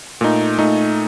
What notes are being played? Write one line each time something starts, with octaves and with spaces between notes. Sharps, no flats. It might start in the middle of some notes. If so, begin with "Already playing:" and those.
A#2 A3 D#4
A#2 A3 D#4